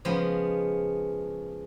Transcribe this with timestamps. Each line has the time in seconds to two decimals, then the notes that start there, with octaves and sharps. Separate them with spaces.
0.05 C#3 F3 G#3 B3